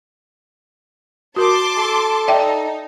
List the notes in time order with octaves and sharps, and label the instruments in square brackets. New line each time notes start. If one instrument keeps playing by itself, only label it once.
[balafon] F#4 A#4 [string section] A5 C6 D6
[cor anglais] A4
[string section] D#4 [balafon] D5 E5 G5